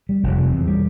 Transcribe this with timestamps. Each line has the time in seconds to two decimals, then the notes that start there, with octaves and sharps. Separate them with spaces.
0.09 G3
0.23 F1
0.38 C3
0.52 E2
0.67 G3